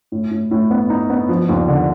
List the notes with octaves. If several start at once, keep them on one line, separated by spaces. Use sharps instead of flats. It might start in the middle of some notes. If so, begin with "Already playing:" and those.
A2
A2
A2
B3
D#4
B3
F3
D#2
D3